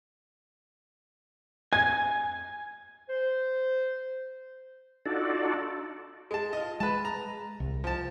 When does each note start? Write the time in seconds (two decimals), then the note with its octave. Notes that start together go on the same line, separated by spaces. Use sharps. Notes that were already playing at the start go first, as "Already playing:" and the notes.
1.73 G#5 G#6
3.10 C5
5.06 D4 D#4 F4 F#4 A4 D5
6.31 G#3 A5
6.53 F4 D#5
6.80 G#3 B4 A5
7.05 A#5
7.60 C2
7.84 F3 A5